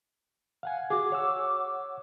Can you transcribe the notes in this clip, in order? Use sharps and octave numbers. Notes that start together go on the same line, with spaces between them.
F5 F#5 G#5
F#4 G#4 D6
C#5 F#5 E6